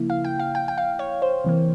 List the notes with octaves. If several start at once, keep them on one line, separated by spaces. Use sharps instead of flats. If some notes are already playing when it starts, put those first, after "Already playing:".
Already playing: C#3 F3 A#3 E4
F5
G5
F5
G5
G5
F5
C#5
C5
C3 E3 A#3